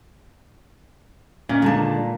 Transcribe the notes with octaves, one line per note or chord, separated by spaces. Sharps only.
A#2 C#4 F4 D#5
D3 D#3 G#3 D4 G#5 A5